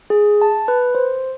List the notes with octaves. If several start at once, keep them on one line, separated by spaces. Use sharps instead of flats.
G#4
A5
B4
C5